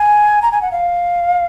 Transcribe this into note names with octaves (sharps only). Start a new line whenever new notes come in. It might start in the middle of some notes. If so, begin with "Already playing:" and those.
Already playing: G#5
A#5
G#5
F#5
F5